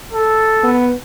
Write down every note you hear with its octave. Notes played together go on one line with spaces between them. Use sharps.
A4
B3